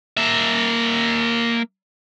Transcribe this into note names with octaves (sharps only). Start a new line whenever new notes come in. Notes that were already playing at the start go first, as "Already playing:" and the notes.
A#3 E5